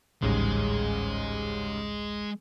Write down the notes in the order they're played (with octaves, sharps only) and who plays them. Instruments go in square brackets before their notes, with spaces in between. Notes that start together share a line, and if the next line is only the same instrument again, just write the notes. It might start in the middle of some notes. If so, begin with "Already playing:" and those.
[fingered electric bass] D1 A1 [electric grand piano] G#2 C#3 G3 [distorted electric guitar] G#3